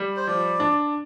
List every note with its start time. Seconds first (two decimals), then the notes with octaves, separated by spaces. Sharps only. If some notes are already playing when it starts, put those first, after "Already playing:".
Already playing: G3
0.17 C5
0.27 F3 D5
0.60 D4